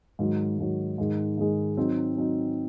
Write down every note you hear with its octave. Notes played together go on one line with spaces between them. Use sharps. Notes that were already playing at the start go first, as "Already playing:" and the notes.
G#2 D#3 F#3
G#2 D#3 F#3
G#2 D#3 G#3 D#4
G#2 D#3 G#3 D#4
F#3 C4 D#4
F#3 C4 D#4